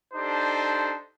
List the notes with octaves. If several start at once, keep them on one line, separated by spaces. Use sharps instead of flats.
D4 D#4 G4 A4 C5